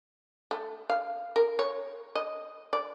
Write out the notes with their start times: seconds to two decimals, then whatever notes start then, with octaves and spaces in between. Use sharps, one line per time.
0.51 A3
0.90 F5
1.36 A#4
1.59 C#5
2.15 D#5
2.73 D5